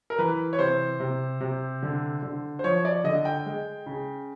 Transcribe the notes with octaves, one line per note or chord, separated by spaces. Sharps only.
A#4
E3 B4
C#5
C3 C5
C3
C3
D3
D3
C5
F3 C#5
D5
D3 D#5
G5
G#3
C#3